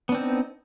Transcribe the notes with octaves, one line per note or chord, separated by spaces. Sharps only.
B3 C4 D4 D#4